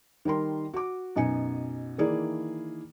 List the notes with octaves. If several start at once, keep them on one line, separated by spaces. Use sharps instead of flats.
D#3 G3 A#4 C6
F#4 D6
F#2 B2 D#4 G#5 C#7
D#3 E3 A#3 E4 G#4 D5